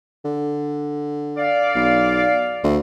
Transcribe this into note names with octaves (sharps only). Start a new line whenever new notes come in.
D3
D5 F5
B1
D2